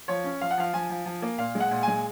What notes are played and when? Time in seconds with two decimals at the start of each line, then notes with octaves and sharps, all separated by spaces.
0.08 F3 C#5
0.24 C#4
0.41 F3 F5
0.51 F#5
0.58 F3 F5
0.73 F3 G#5
0.90 F3
1.06 F3
1.22 A#3
1.38 A#2 F5
1.55 G#3
1.60 F#5
1.71 A#2
1.83 G#3 G#5